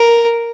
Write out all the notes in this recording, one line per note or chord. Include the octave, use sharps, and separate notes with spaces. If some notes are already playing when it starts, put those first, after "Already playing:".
Already playing: A#4